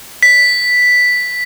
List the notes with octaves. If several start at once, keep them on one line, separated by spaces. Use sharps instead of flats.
B6